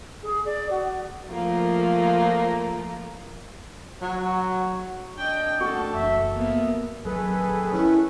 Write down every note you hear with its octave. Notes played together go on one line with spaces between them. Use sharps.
G#4
D5
F#4
F3 A3 A#3 F4
F#3 F#4 C#5
D4 D#5 G5
E3 A3 F#4 A4
F#1 E3 E5
A#3 B3 E5
D#1 D#3 F#3 G#4 A4 B4
B3 C#4 E4